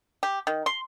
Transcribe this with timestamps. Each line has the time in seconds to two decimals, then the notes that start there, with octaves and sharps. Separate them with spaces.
0.23 G4
0.47 D#3
0.66 C6